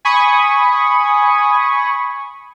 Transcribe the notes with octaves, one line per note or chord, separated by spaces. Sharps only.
G#5 B5 C#6 D#6